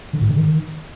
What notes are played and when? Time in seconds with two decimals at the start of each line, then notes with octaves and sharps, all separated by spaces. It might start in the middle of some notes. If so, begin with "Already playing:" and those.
0.13 D3
0.21 G#2
0.29 D3
0.37 D#3